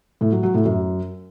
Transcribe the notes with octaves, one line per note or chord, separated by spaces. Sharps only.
A2
F#3
F#3
A2
F#2